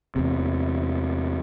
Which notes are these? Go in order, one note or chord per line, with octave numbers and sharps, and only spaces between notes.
E2 C3